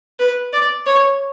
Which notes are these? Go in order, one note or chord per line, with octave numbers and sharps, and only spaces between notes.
B4
D5
C#5